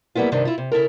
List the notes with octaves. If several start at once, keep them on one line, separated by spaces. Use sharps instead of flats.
F#3 G3 A#3 B3 E4 F4
G2 C3 D#3 D4
E4 F4
C3
C#3 E4 A4 A#4